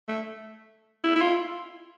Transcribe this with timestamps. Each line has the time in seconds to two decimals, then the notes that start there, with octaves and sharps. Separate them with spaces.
0.08 A3
1.04 E4
1.16 E4
1.21 F4